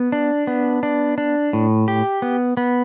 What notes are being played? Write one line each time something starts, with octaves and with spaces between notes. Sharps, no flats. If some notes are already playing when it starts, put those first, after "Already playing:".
Already playing: B3
D4
B3
D4
D4
A2
G4
B3
B3